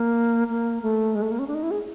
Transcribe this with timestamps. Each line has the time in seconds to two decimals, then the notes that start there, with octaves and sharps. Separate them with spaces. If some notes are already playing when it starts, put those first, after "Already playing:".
Already playing: A#3
0.50 A#3
0.83 A3
1.15 G#3
1.22 A3
1.31 A#3
1.39 C#4
1.48 D4
1.55 D#4
1.63 E4
1.71 G#4